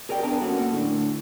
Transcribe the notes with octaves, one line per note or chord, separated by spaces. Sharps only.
G#4 A#4 D5 G5
B3 D4 A#4 B4 A5
A#3 C#4 F#4 A4
A2 D3